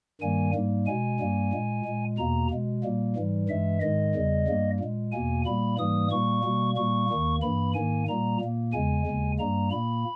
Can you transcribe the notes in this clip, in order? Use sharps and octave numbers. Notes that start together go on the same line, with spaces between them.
G2 D#3 G3 A#3 G#5
G#2 G3 A#3
B2 G#3 G#5
G2 G3 A#3
A#2 G#3
A#2 G#3
E2 B2 A#3 A#5
B2 G#3
A#2 G3 A#3
G#2 E3 G3
G2 E3 G#3 E5
G#2 D#3 G#3 D#5
E2 C#3 G3
G2 G3 A#3
A#2 G#3
E2 B2 A#3 G#5
A#2 G3 A#3 B5
G#2 E3 G3 A#3 D#6
A#2 G3 A#3 C#6
B2 G3 A#3
A#2 G3 A#3 C#6
D#2 D#3 A#3
G2 E3 A#3 B5
G#2 D#3 A#3 G#5
A#2 G3 A#3 A#5
A#2 A#3
E2 C#3 G#3 G#5
D#2 C#3 G#3
G2 G3 A#3 A#5
A#2 A#3 B5